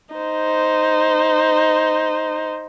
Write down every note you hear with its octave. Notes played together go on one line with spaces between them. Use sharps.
D#4 C5